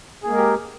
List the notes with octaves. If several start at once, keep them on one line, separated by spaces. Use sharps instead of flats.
G#3 A#3 G4 G#4 A#4